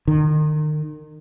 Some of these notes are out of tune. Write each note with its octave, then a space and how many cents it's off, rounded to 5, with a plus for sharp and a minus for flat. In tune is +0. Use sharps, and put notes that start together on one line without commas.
D#3 -35